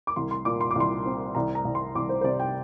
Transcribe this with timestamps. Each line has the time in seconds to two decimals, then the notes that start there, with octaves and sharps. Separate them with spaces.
0.07 D6
0.16 C2 C6
0.31 C6
0.45 A#2 D6
0.61 C6
0.71 D6
0.75 C2 C6
1.06 C4
1.35 C2 A#5
1.55 A#5
1.65 C2
1.75 C6
1.95 C2 D6
2.09 C5
2.21 C5
2.24 C3 D5
2.40 G5